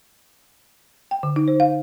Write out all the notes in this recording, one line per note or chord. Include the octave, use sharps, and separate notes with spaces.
G5
D3
D#4
C5
F5